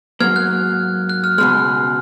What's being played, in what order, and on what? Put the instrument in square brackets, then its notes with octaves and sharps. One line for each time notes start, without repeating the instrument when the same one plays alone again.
[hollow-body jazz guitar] G#2 F#3 A#3 [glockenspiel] F6 G#6
[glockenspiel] F#6
F#6
F6
[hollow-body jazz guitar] C#2 B2 G#3 [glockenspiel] F6